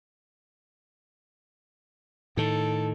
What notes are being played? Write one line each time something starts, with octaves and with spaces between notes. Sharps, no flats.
A2 D#3 A4